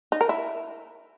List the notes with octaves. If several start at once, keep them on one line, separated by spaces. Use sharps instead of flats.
D#4
A#4
E4